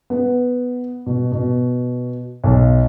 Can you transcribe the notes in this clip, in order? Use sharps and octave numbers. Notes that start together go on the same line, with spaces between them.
B3
B2
B2
B1